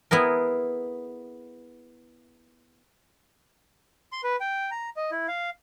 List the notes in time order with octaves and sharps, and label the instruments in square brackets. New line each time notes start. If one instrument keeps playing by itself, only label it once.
[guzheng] B3 E4 G#4 A#4
[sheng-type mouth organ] C6
B4
G5
A#5
D#5
E4
F5